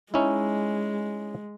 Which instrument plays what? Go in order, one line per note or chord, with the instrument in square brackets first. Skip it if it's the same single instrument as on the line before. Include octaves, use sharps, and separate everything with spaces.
[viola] G#3 [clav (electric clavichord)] C#4 D#4 E4